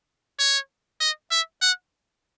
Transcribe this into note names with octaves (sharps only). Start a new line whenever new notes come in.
C#5
D#5
E5
F#5